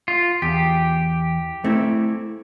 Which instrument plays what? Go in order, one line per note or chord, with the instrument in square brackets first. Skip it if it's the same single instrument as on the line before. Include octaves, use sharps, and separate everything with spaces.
[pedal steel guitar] F4
[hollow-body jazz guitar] E2 [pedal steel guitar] G4
[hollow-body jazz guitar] A3 C4 E4